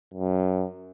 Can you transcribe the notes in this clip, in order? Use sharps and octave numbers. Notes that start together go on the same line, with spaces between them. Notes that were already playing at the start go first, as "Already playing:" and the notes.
F#2